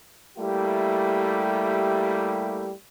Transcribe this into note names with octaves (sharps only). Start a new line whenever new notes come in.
G3 A3 A#3 E4 G4